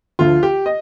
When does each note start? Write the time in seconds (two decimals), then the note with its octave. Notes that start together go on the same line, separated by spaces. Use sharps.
0.19 D2 D3 F3 F4
0.43 G4
0.66 D#5